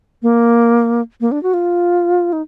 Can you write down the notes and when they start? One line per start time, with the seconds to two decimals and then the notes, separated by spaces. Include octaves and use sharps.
0.22 A#3
1.21 A#3
1.32 D4
1.43 F#4
1.54 F4
2.33 D#4